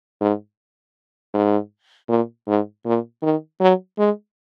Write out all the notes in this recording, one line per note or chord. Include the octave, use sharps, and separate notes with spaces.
G#2
G#2
A#2
G#2
A#2
D#3
F#3
G#3